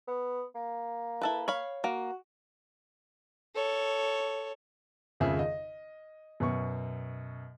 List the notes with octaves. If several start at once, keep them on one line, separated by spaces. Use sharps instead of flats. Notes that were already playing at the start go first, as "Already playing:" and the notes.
B3
A#3
E4 A4 B4
C#5 F5 B5
A#3 F#4
A4 C#5
G#1 F2 C#3 G#4 E5
D#5
F#2 B2 C#6